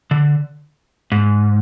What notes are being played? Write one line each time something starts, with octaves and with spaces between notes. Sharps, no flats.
D3
G#2